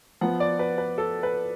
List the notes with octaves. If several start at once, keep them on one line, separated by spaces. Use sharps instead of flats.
F3 B3 F#5
D5
B4
B4
A4
B4